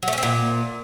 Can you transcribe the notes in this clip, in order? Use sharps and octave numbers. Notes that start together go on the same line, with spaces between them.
F#3
A3
C#4
C4
A#2